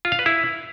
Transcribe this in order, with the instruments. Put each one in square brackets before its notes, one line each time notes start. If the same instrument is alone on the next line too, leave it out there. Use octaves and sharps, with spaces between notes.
[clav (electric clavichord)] F4
F5
B4
E4